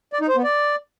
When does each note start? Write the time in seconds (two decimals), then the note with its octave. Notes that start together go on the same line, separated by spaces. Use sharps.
0.13 D5
0.21 D#4
0.28 C5
0.36 B3
0.44 D5